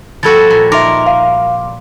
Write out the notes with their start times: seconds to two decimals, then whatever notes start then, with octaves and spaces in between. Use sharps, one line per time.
0.23 F3 G3 F#4 A4 G#6 A6
0.50 A#2
0.72 D#4 A#4 E5 C6 D6
1.07 F5